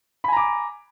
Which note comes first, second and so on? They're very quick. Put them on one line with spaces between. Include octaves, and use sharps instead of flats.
B5 G#5 A#5 D6